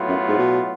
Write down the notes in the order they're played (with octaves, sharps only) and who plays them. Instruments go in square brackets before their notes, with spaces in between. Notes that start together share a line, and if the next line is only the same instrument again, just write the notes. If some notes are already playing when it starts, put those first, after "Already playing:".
Already playing: [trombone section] A2 F#3 B3 F4
[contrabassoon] F#2
G#2
B2